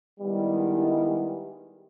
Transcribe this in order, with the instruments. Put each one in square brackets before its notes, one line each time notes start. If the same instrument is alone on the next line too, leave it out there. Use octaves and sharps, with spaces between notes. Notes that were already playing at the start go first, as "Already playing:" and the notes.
[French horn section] D#3 G#3 B3 E4 [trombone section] G3